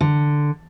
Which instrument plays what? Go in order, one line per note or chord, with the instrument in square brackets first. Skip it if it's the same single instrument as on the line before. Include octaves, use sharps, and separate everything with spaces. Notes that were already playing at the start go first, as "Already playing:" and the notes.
[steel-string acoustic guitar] D3